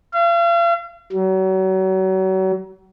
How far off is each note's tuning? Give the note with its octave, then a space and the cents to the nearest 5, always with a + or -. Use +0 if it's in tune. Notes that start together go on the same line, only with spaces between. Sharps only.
F5 -40
F#3 +35